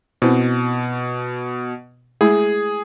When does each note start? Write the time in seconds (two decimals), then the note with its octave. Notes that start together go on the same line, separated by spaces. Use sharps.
0.22 B2 C4 E4 C5
2.21 G#3 A3 E4 G#4